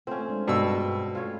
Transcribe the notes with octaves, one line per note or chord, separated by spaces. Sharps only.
A3 C4 C#4 F4 A4
G#3 D4
G2 B2 G#3 E6
A3 F4 A4 C#5